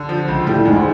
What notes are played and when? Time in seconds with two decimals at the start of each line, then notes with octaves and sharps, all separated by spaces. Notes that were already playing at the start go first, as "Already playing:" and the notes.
Already playing: D3
0.09 F3
0.28 C#2
0.47 A2 G3
0.65 E2 G#2